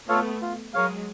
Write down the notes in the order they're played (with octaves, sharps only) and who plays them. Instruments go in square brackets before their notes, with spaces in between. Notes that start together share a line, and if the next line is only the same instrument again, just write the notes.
[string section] A3 B3 [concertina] F4 A4 C#5 F5
[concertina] F4
[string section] F#3 G#3 [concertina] A#4 C#5 F5